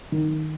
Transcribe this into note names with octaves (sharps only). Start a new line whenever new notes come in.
D#3